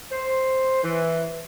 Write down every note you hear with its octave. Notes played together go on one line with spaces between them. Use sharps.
C5
E3